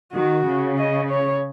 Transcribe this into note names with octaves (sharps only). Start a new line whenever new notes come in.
D#3 F#4
C#3
D#5
C#5